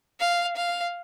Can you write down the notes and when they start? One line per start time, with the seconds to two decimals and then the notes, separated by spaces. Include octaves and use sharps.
0.20 F5
0.57 F5